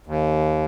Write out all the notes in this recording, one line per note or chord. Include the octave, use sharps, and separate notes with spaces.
D#2